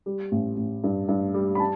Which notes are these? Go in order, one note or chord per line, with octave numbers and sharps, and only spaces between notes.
G3
A1
A1
G2
G2
G3
B5
A5